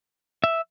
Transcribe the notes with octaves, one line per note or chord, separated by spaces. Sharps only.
E5